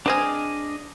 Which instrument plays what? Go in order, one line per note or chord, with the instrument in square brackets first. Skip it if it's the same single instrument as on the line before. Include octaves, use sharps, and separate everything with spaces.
[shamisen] G#3 C4 G#4 [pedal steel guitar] D4 D#5 F6